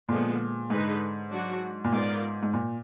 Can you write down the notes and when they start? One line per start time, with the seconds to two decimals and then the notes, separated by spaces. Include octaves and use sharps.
0.09 A#2 D3 F3 G#3 B3
0.70 G#2 D3 G#3 D#4 G#4 B4
1.31 F#3 D4 F#4
1.84 A#2
1.92 G#2 B3 F4 A#4 D5
2.43 G#2
2.54 A#2